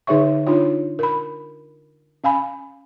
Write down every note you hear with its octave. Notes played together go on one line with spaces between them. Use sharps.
D3 D#4 G#4 C#5 E5 C#6
D4 D#4 F4 C#5
A#4 B5
C#4 F5 G#5 B5